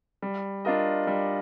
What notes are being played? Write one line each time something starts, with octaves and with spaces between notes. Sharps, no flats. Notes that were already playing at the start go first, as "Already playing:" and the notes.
G3
D4 F4 A#4 D#5
G3